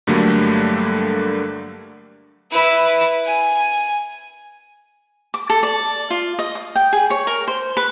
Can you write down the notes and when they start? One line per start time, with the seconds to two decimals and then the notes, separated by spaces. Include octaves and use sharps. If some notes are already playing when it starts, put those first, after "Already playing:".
0.07 G2 D3 F#3 G3 A3 A#3
2.51 E4 B4
3.26 G#5
5.34 D6
5.50 A4
5.63 D5
6.10 F4
6.39 D#5
6.55 D#6
6.76 G5
6.93 G#4
7.10 C#5
7.27 A#4
7.48 C5
7.77 B4